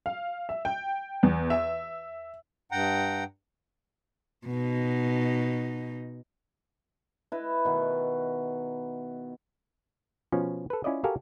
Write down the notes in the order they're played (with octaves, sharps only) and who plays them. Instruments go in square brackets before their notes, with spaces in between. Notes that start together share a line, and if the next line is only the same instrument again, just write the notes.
[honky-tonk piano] F5
E5
G5
E2
E5
[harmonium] G2 F#5 G5 A#5
[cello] B2 D#4
[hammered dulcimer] E4 B4 D#5
B2 D#3
[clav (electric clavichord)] B2 F3 C#4
A4 B4
C#4 E4 F4 D5 D#5
F#4 G4 A4 A#4 F5 G#5